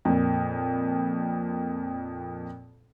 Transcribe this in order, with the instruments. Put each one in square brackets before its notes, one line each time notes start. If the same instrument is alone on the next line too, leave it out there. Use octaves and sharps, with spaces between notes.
[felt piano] F2 A#2